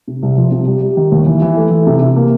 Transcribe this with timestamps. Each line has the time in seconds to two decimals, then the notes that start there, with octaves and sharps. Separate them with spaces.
0.08 C3
0.22 C2
0.37 F3
0.52 C3
0.67 G3
0.82 G3
0.97 D#3
1.12 D#2
1.26 E3
1.42 E3
1.57 A3
1.71 E3
1.87 C3
2.02 C3
2.16 A#3